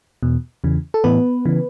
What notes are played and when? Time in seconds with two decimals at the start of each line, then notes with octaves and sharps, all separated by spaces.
0.23 E2 B2
0.64 E2 C#3 E3
0.94 A4
1.04 A2 E3 B3 B4
1.46 C#3 E3